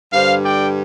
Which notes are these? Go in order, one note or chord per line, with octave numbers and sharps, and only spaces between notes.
G2 D3 G3 C5 F5
D5 G5